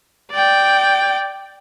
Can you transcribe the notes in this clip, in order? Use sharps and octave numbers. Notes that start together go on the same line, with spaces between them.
D5 G5